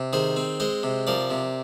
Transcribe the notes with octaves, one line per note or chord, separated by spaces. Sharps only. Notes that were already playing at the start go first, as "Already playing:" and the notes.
Already playing: C3
D#3 G#4 C5
C4
G#3 C5 D#5
C3
F3 A#4 D5
C3